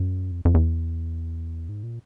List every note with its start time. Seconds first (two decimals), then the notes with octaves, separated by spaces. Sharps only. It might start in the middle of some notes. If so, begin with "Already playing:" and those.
Already playing: F#2
0.32 F2
0.45 F2
0.54 E2
1.69 G#2
1.83 A#2